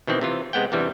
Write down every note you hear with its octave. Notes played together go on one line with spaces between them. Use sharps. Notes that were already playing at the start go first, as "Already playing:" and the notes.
B2 D#3 E3 C4
C3 E3 F4
C3 G#3 B3 F#5 G5
E2 G2 C3 E3 G3